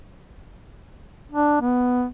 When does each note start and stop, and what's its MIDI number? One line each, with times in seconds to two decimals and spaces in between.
1.32 1.59 62
1.61 2.06 59